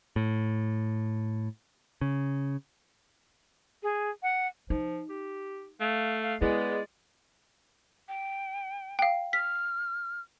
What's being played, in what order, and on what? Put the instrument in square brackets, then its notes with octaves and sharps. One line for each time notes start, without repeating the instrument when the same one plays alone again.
[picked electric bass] A2
C#3
[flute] G#4
F#5
[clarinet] F3 [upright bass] D#4
[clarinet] G4
[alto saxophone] A3 [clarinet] F5
[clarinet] F5
[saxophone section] G#3 [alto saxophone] B3 [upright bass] E4 [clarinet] D5
[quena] G5
[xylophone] F5 G5
[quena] F6 [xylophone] B6